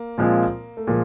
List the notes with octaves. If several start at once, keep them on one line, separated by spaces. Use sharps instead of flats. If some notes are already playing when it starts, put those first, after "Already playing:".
Already playing: A#3
A#2 F3 G#3 C4 F4
A3
A#2 F3 G#3